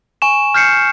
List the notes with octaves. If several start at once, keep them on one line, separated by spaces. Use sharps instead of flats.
G#5 C#6 E7
F6 G6 C7 C#7